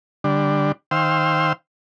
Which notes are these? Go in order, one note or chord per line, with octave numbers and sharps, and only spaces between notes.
D3 G3 D4
D#3 C5 F5 G5 C6 E6